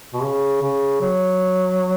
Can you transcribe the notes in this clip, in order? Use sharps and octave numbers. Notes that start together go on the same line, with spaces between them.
B2
C#3
C#3
F#3